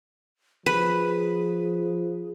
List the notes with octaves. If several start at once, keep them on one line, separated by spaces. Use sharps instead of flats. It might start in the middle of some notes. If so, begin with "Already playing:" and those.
F3 G#4 B4